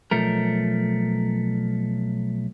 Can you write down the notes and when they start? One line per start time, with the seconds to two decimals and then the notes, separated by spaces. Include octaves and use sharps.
0.11 B1 F3 A3 A#4